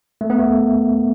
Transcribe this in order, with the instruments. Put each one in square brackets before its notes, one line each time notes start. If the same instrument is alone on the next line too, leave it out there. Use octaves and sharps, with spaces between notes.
[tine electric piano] A3
B3
A3